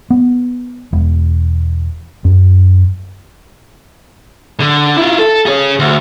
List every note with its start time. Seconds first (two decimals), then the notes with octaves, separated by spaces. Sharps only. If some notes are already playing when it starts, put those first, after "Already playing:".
0.10 B3
0.92 E1
2.25 F#2
4.60 D3
4.97 E4 F4
5.19 A4
5.46 G#4 C#5
5.79 D2